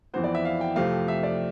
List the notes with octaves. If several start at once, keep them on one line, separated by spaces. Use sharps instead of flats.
F2 E3 B3 C5
D5
E5
F5
G5
F2 C3 F3 A3 F5
E5
D5